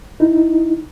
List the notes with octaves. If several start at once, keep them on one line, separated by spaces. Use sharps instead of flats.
D#4 E4